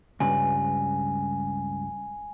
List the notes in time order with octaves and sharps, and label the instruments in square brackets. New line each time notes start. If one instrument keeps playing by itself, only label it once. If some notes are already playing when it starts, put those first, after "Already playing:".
[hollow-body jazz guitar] C#2 G2 [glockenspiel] G#5